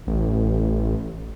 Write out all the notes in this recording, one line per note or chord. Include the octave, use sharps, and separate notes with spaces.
A1